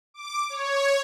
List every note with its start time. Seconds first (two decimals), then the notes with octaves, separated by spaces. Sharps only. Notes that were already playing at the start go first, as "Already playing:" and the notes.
0.14 D6
0.50 C#5